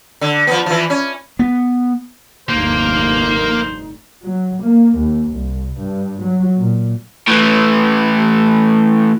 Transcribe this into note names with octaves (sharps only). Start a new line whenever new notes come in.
D3
F3 B3
E3 F3
C#4
B3
F1 D2 G2 A#3 D#4 C5
F#3
A#3
D#2
C2
G2
F#3
A#2
A2 E3